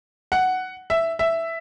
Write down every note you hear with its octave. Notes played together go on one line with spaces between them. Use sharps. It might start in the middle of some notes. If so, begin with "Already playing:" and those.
F#5
E5
E5